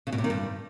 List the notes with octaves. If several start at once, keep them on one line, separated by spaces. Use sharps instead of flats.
C#3
B2
C3
D#3
G2